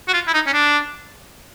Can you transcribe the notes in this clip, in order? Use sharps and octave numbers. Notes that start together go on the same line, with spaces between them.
F#4
F4
E4
D#4
C#4
D4